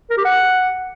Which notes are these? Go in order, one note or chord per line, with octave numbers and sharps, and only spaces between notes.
A#4
G4
F#5